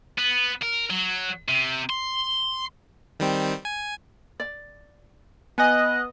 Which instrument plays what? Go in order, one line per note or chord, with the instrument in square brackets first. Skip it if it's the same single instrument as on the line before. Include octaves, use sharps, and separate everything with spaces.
[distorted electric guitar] B3
A#4
F#3
C3
C6
[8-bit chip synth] D#3 G3 C4
G#5
[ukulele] D5
[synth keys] B3 D#5 [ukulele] G#5 [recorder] F#6